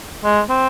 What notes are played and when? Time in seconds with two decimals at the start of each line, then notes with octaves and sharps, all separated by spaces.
0.24 G#3
0.49 C4